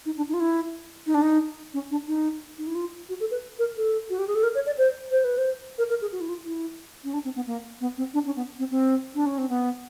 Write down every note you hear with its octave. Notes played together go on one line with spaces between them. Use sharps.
D#4
D4
D#4
F4
E4
D#4
D4
D#4
C#4
D4
D#4
D#4
E4
F4
F#4
A4
B4
A#4
A4
F#4
G4
G#4
A4
A#4
C#5
D5
C5
C5
B4
C5
A#4
A#4
G#4
F#4
E4
F4
E4
C#4
D4
C4
B3
A#3
B3
C4
D4
C#4
B3
C4
C4
D4
C#4
C4
B3